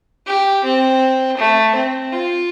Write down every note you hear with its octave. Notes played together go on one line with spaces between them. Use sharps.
G4
C4
A3
C4
F4